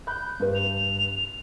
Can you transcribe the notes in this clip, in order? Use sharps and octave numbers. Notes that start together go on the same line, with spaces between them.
B5 F#6 G6
G2 B4
F7